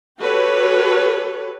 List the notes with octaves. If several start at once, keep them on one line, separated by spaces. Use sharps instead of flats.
F#4 G4 A4 B4 C#5